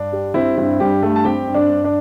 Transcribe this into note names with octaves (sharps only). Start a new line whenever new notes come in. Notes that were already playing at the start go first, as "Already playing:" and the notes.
Already playing: G2 D4
G3
C4 E4
G2 E4
G2 G3 G4
G3 A3 A4
A5
C4 G4 G5
G2
D4 D5
G2
D4 D5